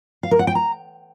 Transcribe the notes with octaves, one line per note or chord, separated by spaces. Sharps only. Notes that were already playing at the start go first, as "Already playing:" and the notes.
F5
A#4
F#5
G5
A#5